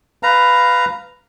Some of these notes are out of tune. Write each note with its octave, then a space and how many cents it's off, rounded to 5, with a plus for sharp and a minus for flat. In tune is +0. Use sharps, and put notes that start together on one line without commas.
B4 +10 F5 +0 A#5 +0